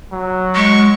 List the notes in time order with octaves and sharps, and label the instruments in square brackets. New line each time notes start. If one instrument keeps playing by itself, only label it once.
[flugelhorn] F#3
[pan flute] G#3 [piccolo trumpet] C#6